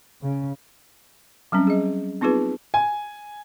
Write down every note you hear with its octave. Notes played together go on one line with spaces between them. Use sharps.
C#3
F#3 G3 C4 C#4
G#4 D#5
B3 C4 D#4 F4 G#4 B4
G#5